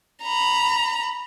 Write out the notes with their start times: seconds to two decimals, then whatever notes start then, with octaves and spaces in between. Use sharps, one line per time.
0.23 A#5 B5